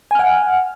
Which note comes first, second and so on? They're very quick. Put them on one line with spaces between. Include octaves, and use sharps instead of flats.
G#5 F6 F#5